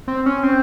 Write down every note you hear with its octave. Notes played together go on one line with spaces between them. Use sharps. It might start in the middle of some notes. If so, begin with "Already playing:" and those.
C4
C#4
C4